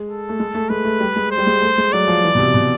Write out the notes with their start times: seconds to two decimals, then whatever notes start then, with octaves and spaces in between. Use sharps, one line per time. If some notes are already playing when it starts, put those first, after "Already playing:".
Already playing: G#3
0.09 A4
0.29 A3
0.39 G#3
0.54 A3
0.70 G#3 B4
0.85 A3
1.00 G3
1.16 G#3
1.31 C5
1.38 G3
1.47 G#3
1.62 A3
1.78 G#3
1.93 F#3 D5
2.08 F3
2.24 E3
2.35 B2
2.39 C3
2.54 B2